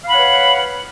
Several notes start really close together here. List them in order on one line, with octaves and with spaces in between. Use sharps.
F5 B5 F#5 C#5 B4